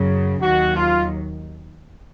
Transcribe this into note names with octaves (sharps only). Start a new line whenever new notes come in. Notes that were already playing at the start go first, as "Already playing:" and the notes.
Already playing: F#2 C#3 F#3
D#2 D#3 F#3 F#4
F4